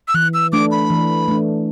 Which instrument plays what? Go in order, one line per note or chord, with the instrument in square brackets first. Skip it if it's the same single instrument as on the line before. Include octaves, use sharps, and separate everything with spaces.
[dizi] E6
[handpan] E3 [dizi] F#6
[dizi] E6
[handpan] A3 D4 [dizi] D6
[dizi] B5
[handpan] E3
A3 D4